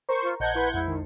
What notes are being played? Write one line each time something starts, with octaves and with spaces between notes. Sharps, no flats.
A#4 C5 A#5 C#6
F4
A#1 C5 D#5 F#5 A5 G6 G#6
E4 B4 C6 C#7
F2 G#3 E4
D#3